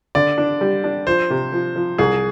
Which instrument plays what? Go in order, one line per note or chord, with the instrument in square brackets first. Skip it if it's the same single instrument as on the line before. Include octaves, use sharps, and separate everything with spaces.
[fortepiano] D3 [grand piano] D5
[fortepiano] D4
G3
D4
[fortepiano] F3 [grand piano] C5
[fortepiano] C3
F3
F3
[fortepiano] C2 [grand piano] G#4